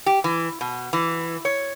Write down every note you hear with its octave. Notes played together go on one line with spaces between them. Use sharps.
G4
E3
B2
E3
C#5